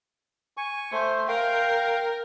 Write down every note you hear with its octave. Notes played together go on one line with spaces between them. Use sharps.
G#5 C#6
A3 C5
A#4 F5 G5